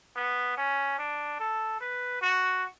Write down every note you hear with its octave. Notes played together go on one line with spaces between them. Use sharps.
B3
C#4
D4
A4
B4
F#4